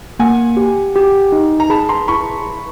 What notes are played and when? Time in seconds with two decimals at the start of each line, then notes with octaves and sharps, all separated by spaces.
0.19 A#3 F#5 G#5
0.57 G4
0.96 G4
1.32 D#4
1.60 A#5
1.70 G#4 A5 B5
1.89 A#5 C6
2.08 E4 B5 C#6